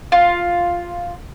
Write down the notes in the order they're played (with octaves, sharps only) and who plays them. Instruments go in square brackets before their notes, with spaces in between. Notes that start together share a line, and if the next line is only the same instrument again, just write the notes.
[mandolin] F4